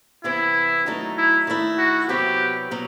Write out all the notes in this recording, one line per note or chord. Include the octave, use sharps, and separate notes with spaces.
C3 E3 B3 E4
D#3 F#3 A3 D#4
E4
D#3 A3 E4
F#4
C3 F#3 B3 F#4 G4 B4
B2 F#3